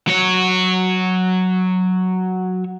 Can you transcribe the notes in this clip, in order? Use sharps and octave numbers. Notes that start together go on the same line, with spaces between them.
F#3 C#5